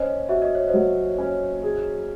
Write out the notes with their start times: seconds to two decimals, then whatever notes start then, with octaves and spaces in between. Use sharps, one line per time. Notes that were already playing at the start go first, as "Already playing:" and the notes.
Already playing: C#4 C5 D#5
0.29 F#4 E5
0.42 D#5
0.55 C#5
0.68 C5 D#5
0.74 F#3
1.18 C#4
1.63 G#4